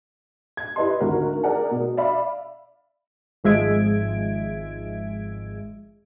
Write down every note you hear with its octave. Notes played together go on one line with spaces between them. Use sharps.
G#6
E4 G4 B4 D5 D#5 C6
G#1 D2 F#4 A#4
G#4 A#4 D5 F#5 G#5
B2
D5 E5 F5 B5
G#1 F3 G#3 E5 G#6 D7